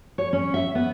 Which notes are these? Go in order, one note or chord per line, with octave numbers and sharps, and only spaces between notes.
C#5
C#4
E5
B3